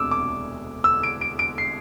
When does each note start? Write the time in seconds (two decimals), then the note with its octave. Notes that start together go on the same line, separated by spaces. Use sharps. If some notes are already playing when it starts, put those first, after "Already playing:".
Already playing: E1 D2 C3 D6 E6
0.11 D6
0.84 E6
1.03 D7
1.21 D7
1.39 D7
1.58 C7